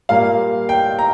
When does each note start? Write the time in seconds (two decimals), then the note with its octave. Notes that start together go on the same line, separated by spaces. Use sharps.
0.09 A#2 G3 A#3 F5
0.69 G5
0.99 A#5